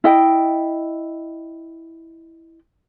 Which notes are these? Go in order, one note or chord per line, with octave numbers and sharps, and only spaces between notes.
E4 D#5 G5